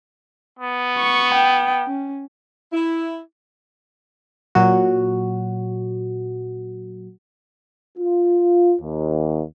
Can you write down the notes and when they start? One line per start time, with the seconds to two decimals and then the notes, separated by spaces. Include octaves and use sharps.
0.59 B3
0.98 C#6
1.34 G5
1.87 C#4
2.73 E4
4.55 A#2 F#3 F#4
7.98 F4
8.81 D#2